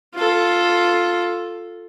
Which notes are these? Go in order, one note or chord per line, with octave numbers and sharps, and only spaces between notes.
F4 A4